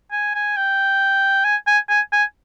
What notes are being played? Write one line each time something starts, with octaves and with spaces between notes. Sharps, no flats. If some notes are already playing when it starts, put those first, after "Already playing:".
G#5
G#5
G5
G#5
G#5
G#5
G#5